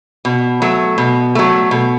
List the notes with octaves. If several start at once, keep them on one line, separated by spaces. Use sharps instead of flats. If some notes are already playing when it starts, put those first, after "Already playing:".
B2
F#3 A3
B2
F#3 A3
B2